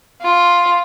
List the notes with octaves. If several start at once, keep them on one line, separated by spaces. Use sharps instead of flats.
F4